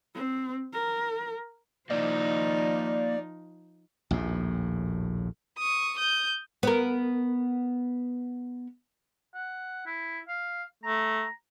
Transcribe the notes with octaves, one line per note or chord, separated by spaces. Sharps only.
C4
A#4
F3 A#3 D#4 C5 D5 D#5
A#1 D#2 A2
C#6 D#6
D#6 G6
B3 A#4
F#5
E4
F5
A3 A#5